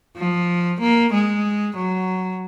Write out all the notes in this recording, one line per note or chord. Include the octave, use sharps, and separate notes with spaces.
F3
A#3
G#3
F#3